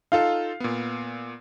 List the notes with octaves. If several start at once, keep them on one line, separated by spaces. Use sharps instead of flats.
D#4 F4 A4 F5
A#2 B3